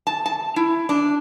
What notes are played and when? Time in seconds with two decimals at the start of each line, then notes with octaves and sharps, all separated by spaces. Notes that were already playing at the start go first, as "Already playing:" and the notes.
0.07 A5
0.26 A5
0.56 E4
0.89 D4